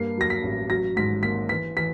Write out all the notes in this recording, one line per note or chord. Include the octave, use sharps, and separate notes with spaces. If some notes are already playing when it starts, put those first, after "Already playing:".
Already playing: G2 A#3 C7
F#3 A#6
B6
A1
F#3 A#6
G#2 B6
A#3 B6
E3 B6
E3 B6